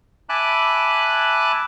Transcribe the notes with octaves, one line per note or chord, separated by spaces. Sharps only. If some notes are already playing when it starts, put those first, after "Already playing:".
E5 G#5 A5 B5 D6 F#6